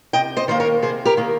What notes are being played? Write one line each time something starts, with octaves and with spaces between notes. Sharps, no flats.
C3 D#5 G5
C5 D#5
D#3 A#3 C5
A#4 C#5
C3 G#4 C5
G4 A#4
D#3 A#3